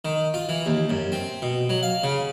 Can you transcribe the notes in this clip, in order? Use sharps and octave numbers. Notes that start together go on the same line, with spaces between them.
D#3
F4
E3
D#2
F#2
C4
B2
F#3
F5
C#3